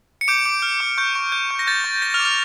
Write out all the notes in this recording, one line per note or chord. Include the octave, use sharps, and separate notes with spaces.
C#7
D6 G6 D7
D6
F6
D6
C#6 G6
C#6
G6
C#6
A#6
G6 A6
C#6
G6 A#6
F6 F7
D6
F6 F7